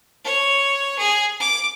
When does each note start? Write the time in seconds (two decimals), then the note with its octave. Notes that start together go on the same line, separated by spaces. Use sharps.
0.25 C#5
0.98 G#4
1.40 D6